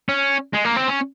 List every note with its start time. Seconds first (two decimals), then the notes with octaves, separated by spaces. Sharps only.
0.09 C#4
0.54 G#3
0.65 A#3
0.77 C4
0.89 C#4